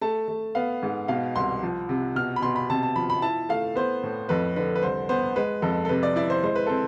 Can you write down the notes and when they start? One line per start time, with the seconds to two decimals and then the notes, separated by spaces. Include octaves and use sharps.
0.02 A3 A5
0.28 A3
0.55 B3 F5
0.83 G#2
1.08 B2 F5
1.36 C2 C6
1.63 F3
1.89 C3
2.16 B2 F6
2.36 B5
2.42 B2 C6
2.56 B5
2.70 C3 A5
2.83 A5
2.96 F3 B5
3.10 B5
3.22 E4 A5
3.49 A3 F5
3.75 B3 C5
4.03 A2
4.29 F2 B4
4.56 D3 B4
4.75 B4
4.83 C2 C5
5.09 B3 C5
5.36 G#3 B4
5.62 F2 A4
5.85 A4
5.89 C3 B4
6.03 D5
6.16 E4 D5
6.30 C5
6.43 G#3 C5
6.55 B4
6.67 C4 A4